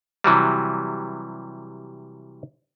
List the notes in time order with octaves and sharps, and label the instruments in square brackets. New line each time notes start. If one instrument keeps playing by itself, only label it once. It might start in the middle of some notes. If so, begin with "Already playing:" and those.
[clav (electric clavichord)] C3 E3 F#3 G3